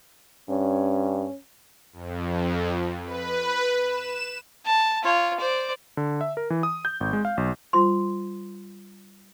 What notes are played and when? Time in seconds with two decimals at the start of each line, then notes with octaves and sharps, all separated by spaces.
0.49 G2 C#4
1.93 F2
3.04 B4
3.87 E7
4.66 A5
5.03 F4 C#5
5.38 C5 D5
5.97 D3
6.21 E5
6.37 A#4
6.50 E3
6.63 D#6
6.85 G6
7.00 G#1
7.13 G#3
7.25 F5
7.37 B1
7.73 G3 F4 C5 C6